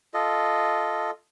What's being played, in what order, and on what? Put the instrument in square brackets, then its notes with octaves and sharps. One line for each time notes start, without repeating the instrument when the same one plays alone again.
[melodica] F4 A4 D#5